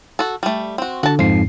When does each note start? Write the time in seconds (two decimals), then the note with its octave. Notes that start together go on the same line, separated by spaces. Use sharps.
0.19 F#4 A4
0.43 G3 A3
0.78 C4 F#4
1.03 D3 F#4 A5
1.19 F2 G#2 F3 C7